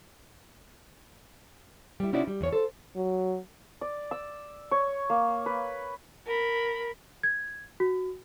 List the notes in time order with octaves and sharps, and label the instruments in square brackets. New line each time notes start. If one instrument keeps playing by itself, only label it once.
[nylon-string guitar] G3 E4
C3 C#4 D#4 E4 F#4 D5
G3
E2 C#5
A4 C5
[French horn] F#3
[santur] D5
E6
C#5
A#3
B4
[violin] A#4 B5
[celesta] G#6
F#4